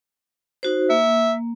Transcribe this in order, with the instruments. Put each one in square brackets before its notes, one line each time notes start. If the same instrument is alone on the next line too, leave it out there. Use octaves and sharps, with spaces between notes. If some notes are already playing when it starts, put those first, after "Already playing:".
[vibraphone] D#4 F#4 C5
[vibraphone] A#3 [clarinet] E5